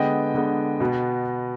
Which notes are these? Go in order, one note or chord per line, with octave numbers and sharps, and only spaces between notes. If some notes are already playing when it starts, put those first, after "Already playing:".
Already playing: D3 G#3 B3 D#5 G5
D3 G#3 B3
B2 B3